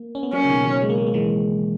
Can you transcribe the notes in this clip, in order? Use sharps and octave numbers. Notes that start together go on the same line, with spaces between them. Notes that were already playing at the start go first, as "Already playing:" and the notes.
Already playing: A#3
C#4
B3
F#3 A#3 C#4
C#3
B2 D#3
D#3 F#3
G#3
A#3
G#3
A#3
E3 G#3